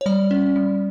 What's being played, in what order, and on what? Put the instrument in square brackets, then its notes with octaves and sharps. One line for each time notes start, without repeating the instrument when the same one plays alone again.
[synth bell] C#5
G3 D5
C#4
G3